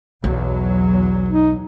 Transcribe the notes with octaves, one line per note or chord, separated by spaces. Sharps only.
B1 E2 F#3
D#4